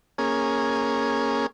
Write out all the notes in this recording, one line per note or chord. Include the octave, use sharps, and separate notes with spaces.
A#3 C#4 G#4